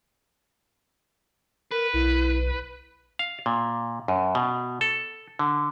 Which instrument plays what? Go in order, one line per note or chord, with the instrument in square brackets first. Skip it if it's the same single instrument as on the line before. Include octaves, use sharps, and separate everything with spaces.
[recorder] A#4 [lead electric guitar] B4
[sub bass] B1 [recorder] E4
[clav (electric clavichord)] F5
A#2
F#2
B2
A4
D3